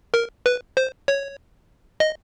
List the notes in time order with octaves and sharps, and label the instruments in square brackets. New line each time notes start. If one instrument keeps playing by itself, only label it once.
[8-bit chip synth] A#4
B4
C5
C#5
D#5